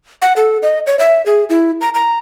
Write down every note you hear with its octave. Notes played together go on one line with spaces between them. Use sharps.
F#5
A4
D#5
C#5
E5
G#4
E4
A#5
A#5